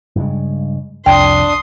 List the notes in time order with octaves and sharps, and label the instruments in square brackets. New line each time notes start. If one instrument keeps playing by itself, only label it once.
[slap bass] G2 C#3 G#3
[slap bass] C2 F2 [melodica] D4 [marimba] G5 [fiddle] C6 D#6